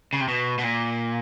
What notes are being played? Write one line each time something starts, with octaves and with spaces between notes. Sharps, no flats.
C#3
C3
B2
B2
A#2